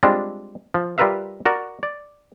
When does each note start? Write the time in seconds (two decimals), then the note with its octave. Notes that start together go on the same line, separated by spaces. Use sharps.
0.03 G3 G#3 C4 D4 F4
0.74 F3
0.98 G3 F4 A#4 B4 E5 F5
1.45 F#4 A#4 D5
1.83 D5